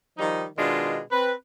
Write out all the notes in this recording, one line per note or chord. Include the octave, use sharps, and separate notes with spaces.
D#3 F3 G3 D#4
B2 D#3 G#3 D4 F4
C4 B4